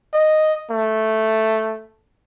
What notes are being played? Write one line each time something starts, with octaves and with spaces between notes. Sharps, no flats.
D#5
A3